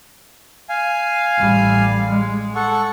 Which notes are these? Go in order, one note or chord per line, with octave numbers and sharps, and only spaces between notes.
F5 G#5
A1 G3
G#3
A4 F#5 C#6